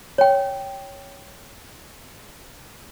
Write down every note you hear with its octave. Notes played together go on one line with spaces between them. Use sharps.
C#5 G5